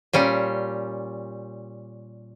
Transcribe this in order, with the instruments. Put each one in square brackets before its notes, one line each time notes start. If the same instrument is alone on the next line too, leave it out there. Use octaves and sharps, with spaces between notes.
[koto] A#2 G3 C#4